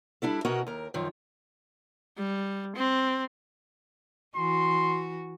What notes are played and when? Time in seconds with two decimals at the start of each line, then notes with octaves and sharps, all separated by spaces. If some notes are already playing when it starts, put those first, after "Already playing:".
0.22 G3 D4 E4 A4
0.45 B2 C#4 F#4 A#4 D#5
0.67 D#2 A#4
0.94 F#2 D#3 F3
2.17 G3
2.76 C4
4.36 E3 F#4 C6